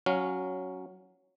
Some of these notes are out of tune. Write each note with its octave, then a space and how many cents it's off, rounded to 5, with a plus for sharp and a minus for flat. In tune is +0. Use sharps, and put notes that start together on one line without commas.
F#3 +0 C#4 +0 F5 +20